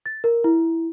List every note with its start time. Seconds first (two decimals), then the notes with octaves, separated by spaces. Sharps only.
0.06 A6
0.24 A#4
0.44 E4